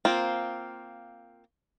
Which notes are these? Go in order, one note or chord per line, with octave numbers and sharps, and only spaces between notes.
A#3 C4 F4